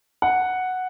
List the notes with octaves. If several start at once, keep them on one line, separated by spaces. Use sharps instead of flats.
F#5